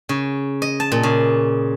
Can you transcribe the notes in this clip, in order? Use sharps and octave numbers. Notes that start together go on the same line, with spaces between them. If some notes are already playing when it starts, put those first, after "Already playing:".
C#3
D#5
A5
A#2
C#3